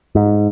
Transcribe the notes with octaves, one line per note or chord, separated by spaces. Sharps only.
G#2